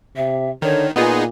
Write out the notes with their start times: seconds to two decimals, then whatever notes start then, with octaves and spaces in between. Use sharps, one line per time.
0.16 C3 E5
0.62 D3 D#3 C#5
0.96 A#2 B3 D#4 F4 G#4